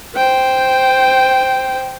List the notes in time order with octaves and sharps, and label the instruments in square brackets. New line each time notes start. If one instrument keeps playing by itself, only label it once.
[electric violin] C5 G5